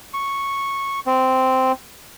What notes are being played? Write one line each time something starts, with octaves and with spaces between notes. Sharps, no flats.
C#6
C4